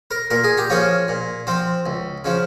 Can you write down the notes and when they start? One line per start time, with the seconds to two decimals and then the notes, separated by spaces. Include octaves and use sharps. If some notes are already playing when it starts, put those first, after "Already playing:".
0.11 A#4
0.30 A#2 A#4
0.44 G#4
0.57 G4
0.70 F3 A#3 C#4 G#4
1.08 A#2
1.47 F3 C4
1.86 C#2
2.25 C#3 F3